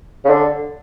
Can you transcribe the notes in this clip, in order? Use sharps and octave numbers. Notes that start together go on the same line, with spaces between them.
C#3
D3